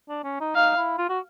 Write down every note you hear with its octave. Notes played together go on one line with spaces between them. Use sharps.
D4
C#4
D#4
D#4 F5
E4
F4
F#4